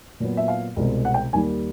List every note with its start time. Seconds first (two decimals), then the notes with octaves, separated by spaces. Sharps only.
0.20 A#2 F#3 B3
0.37 E5
0.48 F5
0.76 C2 B2 G#3 C4
1.05 F#5
1.14 G5
1.33 D#2 D#3 G3 A#3 G#5